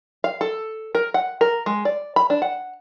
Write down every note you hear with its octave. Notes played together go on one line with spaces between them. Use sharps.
F5
A4
A#4
F#5
A#4
G#3
D5
B5
D4
F#5